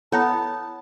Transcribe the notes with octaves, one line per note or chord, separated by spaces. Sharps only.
B3 E4 A4 C#5 F#5 A5 A#5